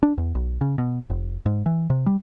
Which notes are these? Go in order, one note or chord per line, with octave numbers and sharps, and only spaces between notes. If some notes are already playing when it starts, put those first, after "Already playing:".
D4
E2
B1
C#3
B2
F1
G#2
E3
C3
G3